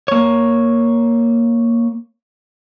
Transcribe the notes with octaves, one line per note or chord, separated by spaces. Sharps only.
A#3 C#5